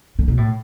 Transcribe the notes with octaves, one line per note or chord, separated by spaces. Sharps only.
D3
B2
A2